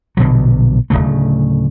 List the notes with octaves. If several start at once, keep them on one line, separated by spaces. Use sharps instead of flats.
A#1 B2 D3 F#3
D1 C#2 C#3 A3